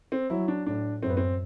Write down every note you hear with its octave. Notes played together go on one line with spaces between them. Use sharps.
C4
F#3 E4
D4
A2 D4
F#2 C4
B3
C4